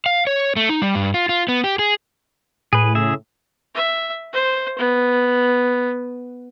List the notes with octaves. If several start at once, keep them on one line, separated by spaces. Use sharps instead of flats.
F5
C#5
A3
D#4
G3
G2
F4
F4
B3
G4
G#4
A2 G#4 B4
C#3 G#4 E5
E5
C5
B3